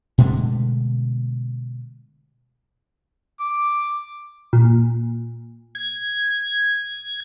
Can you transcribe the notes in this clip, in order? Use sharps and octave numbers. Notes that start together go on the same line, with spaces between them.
B2 D3 G#3 A3
D6
A#2
G#6